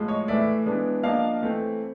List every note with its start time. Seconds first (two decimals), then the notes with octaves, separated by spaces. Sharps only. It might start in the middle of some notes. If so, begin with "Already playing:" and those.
Already playing: A2 F3 G#3
0.08 C#5 D#5
0.28 A2 E3 A3 D5 E5
0.66 E3 G#3 B3 D4
1.03 F3 A#3 D4 D#5 F5
1.42 E3 A3 C4